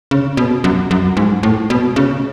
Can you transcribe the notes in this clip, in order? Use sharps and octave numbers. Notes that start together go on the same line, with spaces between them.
C#3
B2
F#2
F#2
G#2
A2
B2
C#3